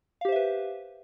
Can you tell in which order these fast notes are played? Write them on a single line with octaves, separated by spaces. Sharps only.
F5 G4 C5 E5 B4